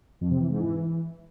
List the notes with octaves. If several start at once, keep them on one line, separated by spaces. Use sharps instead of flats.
F2
C3
E3
G#2
E3